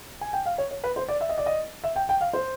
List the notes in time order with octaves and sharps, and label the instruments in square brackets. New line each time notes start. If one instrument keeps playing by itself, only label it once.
[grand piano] G#5
G5
F5
C#5
C#5
B4
C5
D5
E5
D#5
D5
D#5
E5
G5
G5
F5
C5